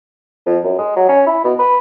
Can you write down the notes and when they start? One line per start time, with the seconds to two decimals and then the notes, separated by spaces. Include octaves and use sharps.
0.47 F2
0.64 F#2
0.78 G#3
0.96 F#3
1.09 C#4
1.27 E4
1.45 B2
1.59 B4